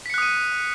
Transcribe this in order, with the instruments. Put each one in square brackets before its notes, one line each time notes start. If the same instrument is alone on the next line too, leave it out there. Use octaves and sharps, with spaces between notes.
[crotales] B6
C#7
F#6
D#6
D#7